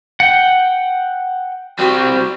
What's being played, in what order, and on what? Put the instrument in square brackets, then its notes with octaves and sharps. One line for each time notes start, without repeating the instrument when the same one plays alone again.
[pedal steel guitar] F#5 G5
[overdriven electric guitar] G3 C4 [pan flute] F#4